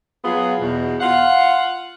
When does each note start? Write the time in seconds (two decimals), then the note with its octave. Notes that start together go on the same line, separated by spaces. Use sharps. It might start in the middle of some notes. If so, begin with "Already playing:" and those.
0.25 F#3 B3 F4 G#4
0.60 E2 B2
1.01 F4 F5 F#5